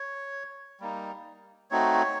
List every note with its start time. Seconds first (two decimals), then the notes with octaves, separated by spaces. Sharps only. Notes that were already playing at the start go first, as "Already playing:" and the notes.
Already playing: C#5
0.80 G3 A#3 D#4
1.70 A3 C4 D#4 F#4 C#5